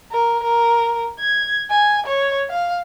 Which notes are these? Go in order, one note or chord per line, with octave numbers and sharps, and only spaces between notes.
A#4
A#4
G#6
G#5
C#5
F5